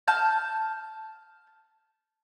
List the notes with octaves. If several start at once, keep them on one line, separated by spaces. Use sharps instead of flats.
A5 F6 G6